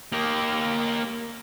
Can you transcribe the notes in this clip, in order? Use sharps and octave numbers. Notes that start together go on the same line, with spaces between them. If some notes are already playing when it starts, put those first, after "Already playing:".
A#3 G4